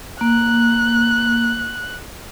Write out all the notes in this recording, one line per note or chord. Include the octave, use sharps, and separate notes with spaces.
A#3 F#6